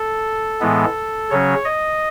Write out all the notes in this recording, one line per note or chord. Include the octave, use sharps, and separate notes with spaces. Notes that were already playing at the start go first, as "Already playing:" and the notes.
Already playing: A4
A2 E3 G#3 B3
C#3 F#3 C#4 C#5
D#5